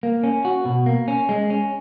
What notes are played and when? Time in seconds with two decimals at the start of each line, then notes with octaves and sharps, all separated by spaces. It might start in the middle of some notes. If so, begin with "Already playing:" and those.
0.03 A#3
0.24 C#4
0.45 F#4
0.66 B2
0.86 A#3
1.08 C#4
1.29 G#3
1.50 C#4